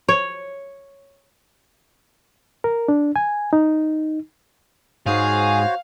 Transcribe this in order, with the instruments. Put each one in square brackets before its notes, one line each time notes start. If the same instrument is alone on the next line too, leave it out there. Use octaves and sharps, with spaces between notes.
[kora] C#5
[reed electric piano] A#4
D4
G#5
D#4
[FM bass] G#2 [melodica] F#4 C5 C#5 [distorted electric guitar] G#4 [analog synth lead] F5